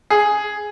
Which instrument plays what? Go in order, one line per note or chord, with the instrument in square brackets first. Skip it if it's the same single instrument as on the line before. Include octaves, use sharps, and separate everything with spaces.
[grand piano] G#4